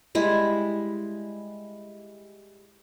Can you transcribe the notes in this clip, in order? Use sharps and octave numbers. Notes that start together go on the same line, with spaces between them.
G3 G#3 E4